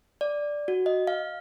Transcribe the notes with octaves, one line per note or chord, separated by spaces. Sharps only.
D5
F#4
D#5
F5